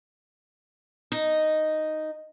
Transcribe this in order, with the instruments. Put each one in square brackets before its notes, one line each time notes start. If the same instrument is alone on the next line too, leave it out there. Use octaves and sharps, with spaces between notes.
[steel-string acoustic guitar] D#4